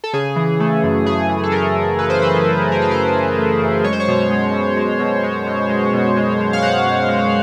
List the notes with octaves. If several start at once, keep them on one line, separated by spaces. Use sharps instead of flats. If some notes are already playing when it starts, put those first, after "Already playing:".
A4
C#3 G#4
E3
A3
F#2
C#3 G#4
E3
A4
A3 A#4
F#2
C#3 B4
C5
E3 B4
A3
F#2 A#4
B4
C#3 C5
E3
A3
F#2
G#3 C#5
C5
C#5
B2
G#3
B2
G#3
B2
G#3
B2
G#3
B2
G#3
B2
F5
G#3 F#5
B2
G#3